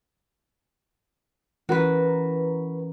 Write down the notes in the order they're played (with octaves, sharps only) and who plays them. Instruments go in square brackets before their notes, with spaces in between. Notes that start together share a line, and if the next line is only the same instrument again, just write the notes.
[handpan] E3 C#4 A#4 [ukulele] F#4 B4